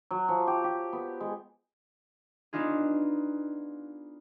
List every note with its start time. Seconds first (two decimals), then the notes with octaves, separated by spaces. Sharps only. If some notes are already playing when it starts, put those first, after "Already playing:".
0.11 F#3
0.28 F3
0.47 G4
0.64 G4
0.93 B3
1.20 G#3
2.53 B3 D4 D#4 F4 G#4